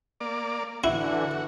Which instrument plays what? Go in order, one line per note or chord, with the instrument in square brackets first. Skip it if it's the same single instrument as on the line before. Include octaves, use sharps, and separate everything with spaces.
[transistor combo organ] A#3 D5
[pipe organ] D3 E3 [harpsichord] E4 [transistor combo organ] F#4